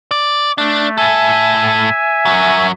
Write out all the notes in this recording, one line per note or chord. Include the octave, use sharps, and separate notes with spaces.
D5
A3 D4
A2 A4 E5 G#5
F#2 F#3